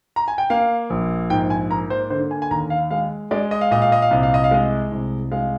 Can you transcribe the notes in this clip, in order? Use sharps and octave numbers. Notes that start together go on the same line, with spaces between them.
A#5
G#5
G5
A#3 F5
A#1
G#2 G5
G#5
A#3 A#5
C5
D3 C5
G#5
G#5
D#2 A#5
F5
G#3 F5
G#3 D5
D#5
F5
A#2 D#5
F5
D#5
F5
C2 D#5
F5
D#5
F5
G#3 D#5
C2
G#3 F5